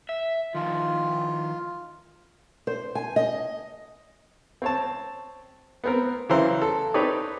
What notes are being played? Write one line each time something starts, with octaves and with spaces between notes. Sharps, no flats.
E5
D#3 F3 F4
C5
G#5
D#5
C4 C#5 A5
B3 C4 A#4
C#3 E3 F#3 E4 A#4 C5
A4
C4 D#4 G4 B4 C#5 D5